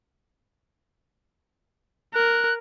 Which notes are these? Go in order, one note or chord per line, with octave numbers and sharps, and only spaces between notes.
A#4 F#6